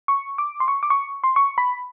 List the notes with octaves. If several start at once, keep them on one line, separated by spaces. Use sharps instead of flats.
C#6
D6
C6
C#6
D6
C#6
C6
C#6
B5